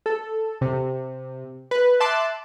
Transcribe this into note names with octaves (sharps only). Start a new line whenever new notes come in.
A4
C3
B4
E5 A5 C6 D6 F#6